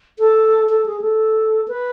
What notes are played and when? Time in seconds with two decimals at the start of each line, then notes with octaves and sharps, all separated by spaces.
0.19 A4
0.69 A4
0.86 G#4
1.01 A4
1.68 B4